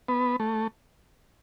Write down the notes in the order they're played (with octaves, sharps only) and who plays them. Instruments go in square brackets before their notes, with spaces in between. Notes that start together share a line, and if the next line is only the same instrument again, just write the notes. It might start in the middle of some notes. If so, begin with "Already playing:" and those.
[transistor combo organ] B3
A3